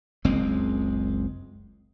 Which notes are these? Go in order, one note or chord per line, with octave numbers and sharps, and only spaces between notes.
F#1 C#2 G#3 C4